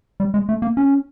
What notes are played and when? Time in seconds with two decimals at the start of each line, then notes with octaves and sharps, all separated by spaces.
0.20 G3
0.34 G#3
0.49 A3
0.62 A#3
0.77 C#4